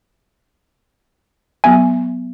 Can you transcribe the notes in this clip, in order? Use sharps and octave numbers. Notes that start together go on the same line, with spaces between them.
F#3 B3 E5 G#5